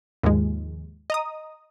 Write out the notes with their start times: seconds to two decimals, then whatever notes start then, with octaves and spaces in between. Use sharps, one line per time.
0.23 D#2 G#2 F3 G#3
1.10 D#5 A#5 D#6